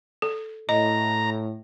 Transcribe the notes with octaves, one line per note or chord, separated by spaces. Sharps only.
A4
A2 D#5 A#5